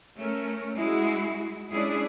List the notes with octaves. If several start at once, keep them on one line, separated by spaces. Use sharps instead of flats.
A3 C#4 A#4
G#3 E4 F#4
G#3 C#4 D4 E4 G#4